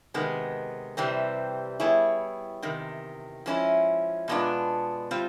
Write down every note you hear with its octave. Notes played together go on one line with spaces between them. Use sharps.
C3 D#3 G#3 B3
C3 E3 G3 C4
G3 B3 E4 G#4 C#5
E2 C3 D#3
F3 G#3 C#4 E4
B2 G#3 B3 D4 F4
G3 C4 F4